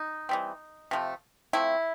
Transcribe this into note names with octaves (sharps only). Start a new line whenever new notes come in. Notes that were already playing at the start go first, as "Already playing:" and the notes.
Already playing: D#4
E3 G3 C4
C3 F3 A3
F3 A3 C4 E4